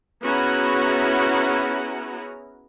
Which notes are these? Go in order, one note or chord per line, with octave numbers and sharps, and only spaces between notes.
B3 C#4 E4 F#4 G#4 A#5